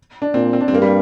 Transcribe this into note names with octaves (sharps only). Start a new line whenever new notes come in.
D4
A#2 C4
C4
D4
C4
G2 A#3
G3